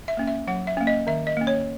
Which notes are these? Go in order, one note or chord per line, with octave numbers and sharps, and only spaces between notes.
E5
A#3 C#4
E5
F#3 F#5
E5
A#3 C#4
D#5
D#3 E5
D#5
A#3 C#4
C#5